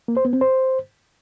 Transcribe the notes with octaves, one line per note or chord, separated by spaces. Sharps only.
A#3
C5
B3
C4
C5